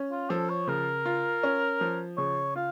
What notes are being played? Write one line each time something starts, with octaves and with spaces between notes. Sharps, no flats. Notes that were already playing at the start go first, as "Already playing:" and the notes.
Already playing: C#4
F4
F3 A4
C#5
C#3 A#4
F4
C#4
F3
C#3 C#5
F4 F5